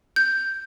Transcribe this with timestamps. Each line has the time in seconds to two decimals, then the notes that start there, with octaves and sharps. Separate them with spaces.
0.16 G6